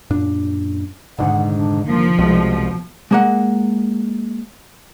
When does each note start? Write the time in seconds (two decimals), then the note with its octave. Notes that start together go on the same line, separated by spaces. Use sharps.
0.10 F#2 A#2 D4
1.19 F1 G#2 D3 D#3 F#5
1.56 D4
1.86 F3 A#3
2.19 C2 B2 G#3
3.11 G#3 A#3 F#5